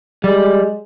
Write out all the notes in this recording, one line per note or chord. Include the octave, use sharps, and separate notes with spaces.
G3 G#3